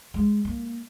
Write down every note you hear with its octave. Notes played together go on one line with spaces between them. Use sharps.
G#3
A#3